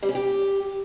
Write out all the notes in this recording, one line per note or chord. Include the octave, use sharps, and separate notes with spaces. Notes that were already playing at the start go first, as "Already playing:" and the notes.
G3
C#4
G4